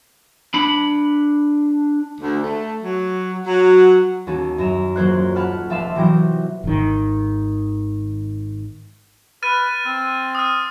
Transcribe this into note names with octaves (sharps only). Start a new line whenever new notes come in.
D4 B5
D2
A3
F#3
F#3
D#2 C#4 F#4 A5
F#2 A#5 E7
D#1 F#3 A#3 C5 C#5 F#6
F#5 A5 B5 C#6 F6 F#6
F1 E5 F5 A5 C6 E7
C3 E3 F#3 G5 G6 A#6
G#1 D#3
B4 F6 A6 D#7
C4
D#6 F6